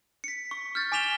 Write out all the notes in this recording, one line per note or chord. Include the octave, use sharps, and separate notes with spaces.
B6 C#7
C#6
F6 G6 A6
G#5 D6 B6 E7 F7 G7